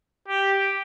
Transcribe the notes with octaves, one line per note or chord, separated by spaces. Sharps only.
G4